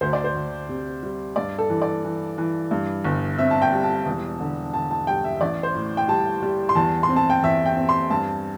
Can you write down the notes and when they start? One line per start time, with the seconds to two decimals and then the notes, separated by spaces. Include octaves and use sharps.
0.01 D2 C5
0.13 D5
0.24 C5
0.35 D2
0.69 C3
1.03 G3
1.36 G2 D5
1.58 A4
1.70 E3
1.82 D5
2.04 E3
2.38 E3
2.71 G2
3.04 G1
3.39 C4 E5
3.51 A5
3.62 G5
3.72 G3
3.84 A5
4.05 E1
4.40 D3
4.74 D3 A5
4.91 A5
5.07 G3 G5
5.24 E5
5.37 E5
5.41 A1 D5
5.63 C5
5.75 A2
5.97 G5
6.08 G3 A5
6.43 G3
6.69 C6
6.75 E2 A5
7.03 C6
7.09 C4
7.16 A5
7.30 G5
7.43 E2 E5
7.66 G5
7.77 C4
7.89 C6
8.10 G2 A5